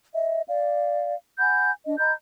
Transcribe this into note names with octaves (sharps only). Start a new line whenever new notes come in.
D#5 E5
D5 F5
F#5 G#5 B5 G6
D4 D#5
D#5 A#5 B5 G6